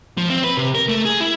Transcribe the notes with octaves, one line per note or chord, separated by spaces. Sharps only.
F3
C4
B4
C3
A#4
A3
G#4
E4